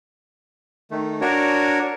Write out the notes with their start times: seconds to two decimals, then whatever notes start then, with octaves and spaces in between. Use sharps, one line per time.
0.91 D#3 A3
1.21 D4 F#4 A#4 C#5